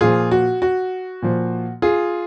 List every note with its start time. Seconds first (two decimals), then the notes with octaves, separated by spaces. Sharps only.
0.01 A#2 F3 F4 G#4
0.31 F#4
0.62 F#4
1.22 A#2 F3
1.82 F4 G#4